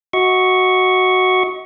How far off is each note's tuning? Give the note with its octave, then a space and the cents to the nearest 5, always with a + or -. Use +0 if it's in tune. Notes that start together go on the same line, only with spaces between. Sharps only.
F#4 +0 D#5 +40 C#6 +0